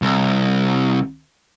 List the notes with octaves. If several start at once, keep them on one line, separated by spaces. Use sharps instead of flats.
C2